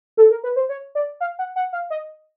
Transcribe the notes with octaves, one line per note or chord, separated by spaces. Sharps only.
A4
A#4
B4
C5
C#5
D5
F5
F#5
F#5
F5
D#5